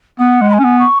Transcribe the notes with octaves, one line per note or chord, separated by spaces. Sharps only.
B3 F#5
G#3
B5
G#5
C#4
B3
C#6